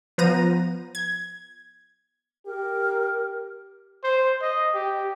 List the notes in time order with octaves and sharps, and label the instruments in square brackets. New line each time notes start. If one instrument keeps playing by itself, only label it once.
[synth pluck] F3 B3 A#5 D#7
G#6
[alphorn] G4 [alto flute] A#4
[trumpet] C5
D#5
G4